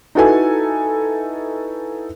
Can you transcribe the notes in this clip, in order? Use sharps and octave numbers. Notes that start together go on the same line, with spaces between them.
D#4 E4 F#4 A4 B4 G#5